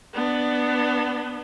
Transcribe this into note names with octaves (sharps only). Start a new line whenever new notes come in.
B3 D4